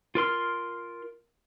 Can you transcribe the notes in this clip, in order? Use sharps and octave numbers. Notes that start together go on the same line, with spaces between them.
F4 A#4 C6 F6